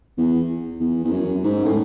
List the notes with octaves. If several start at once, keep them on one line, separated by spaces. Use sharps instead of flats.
E2
E2
E2
F#2
G#2
A2